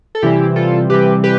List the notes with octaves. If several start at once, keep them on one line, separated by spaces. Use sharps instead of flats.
A4
C3 E3 G3 C4 E4 G4
F4 A4
C3 E3 G3 C4 G4 B4
G4 B4